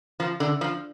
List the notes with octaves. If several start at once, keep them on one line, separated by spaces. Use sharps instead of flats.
F3
D3
F3